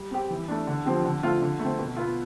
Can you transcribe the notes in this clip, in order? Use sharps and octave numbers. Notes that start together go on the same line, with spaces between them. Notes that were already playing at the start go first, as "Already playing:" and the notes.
Already playing: G3
C4 G4
E3
A3 D4
D3
F3 C4 G4
D3
A3 C4 F4
D3
A3 C4
B2
B3 F4